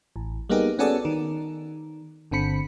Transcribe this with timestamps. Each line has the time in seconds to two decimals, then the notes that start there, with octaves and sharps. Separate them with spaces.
0.16 A1
0.49 G3 A#3 B3 D#4 G4 G#4
0.79 B3 C#4 F#4 G#4 A4 D5
1.05 D#3
2.31 G1 D3 C4 B5 C#7